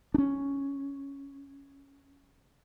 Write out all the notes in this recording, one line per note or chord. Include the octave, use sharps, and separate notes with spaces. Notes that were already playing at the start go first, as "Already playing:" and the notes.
C#4 D4